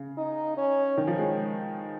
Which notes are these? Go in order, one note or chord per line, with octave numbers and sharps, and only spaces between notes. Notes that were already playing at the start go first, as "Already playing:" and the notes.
Already playing: C#3
D#4
C#4
D#3
F3
G#3